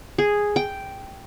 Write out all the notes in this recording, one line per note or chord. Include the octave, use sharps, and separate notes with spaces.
G#4
G5